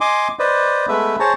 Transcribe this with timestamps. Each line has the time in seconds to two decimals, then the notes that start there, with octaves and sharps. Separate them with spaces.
0.01 D#5 G#5 C6 D6
0.39 B4 C5 D5 D#5
0.89 G#3 A3 B3 B4 E5
1.20 G#4 C5 C#5 A5 A#5